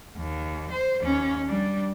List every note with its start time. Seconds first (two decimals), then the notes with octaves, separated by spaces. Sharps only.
0.16 D#2
0.71 C5
1.03 D#2 C#4
1.46 G3 D4